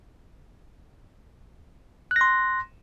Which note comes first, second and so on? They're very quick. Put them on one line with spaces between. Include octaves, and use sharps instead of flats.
F#6 A#6 C6